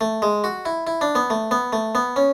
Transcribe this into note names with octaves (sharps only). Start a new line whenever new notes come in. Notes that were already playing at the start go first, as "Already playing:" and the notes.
A3
G#3
F#4
E4
E4
D4
B3
A3
B3
A3
B3
C#4